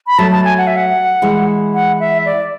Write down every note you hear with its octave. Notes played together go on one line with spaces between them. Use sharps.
B5
F#3 A3 A5
A5
G#5
F#5
E5
F#5
E3 G#3
F#5
E5
D5